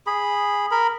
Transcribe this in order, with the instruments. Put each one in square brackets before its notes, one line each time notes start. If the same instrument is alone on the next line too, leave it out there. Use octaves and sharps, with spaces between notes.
[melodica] G#4 B5
A#4 B5